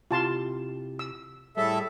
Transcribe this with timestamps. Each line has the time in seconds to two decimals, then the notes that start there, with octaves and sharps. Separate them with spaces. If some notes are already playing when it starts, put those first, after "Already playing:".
0.11 C3 E4 F4 G4 A5 C6
0.99 E6
1.57 A2 G3 G#4 A4 C#5 E5